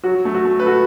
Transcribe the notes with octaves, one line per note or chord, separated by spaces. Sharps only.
F#3 F#4
F#3
A3
F#4
A3
B4
F#4 A4